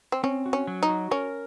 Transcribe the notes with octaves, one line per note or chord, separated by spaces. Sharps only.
C4
C4 C#4
F#4
C#4
F#3
D#4
F#4
C#4 A#4